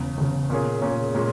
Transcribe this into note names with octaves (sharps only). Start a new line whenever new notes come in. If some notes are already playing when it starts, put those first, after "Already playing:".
Already playing: E1 E2 C#3
E1 E2 C#3
A#2 A#3 C#4 G#4
A#2 A#3 C#4 G#4
A#2 G#3 C#4